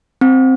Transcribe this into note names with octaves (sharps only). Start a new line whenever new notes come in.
C4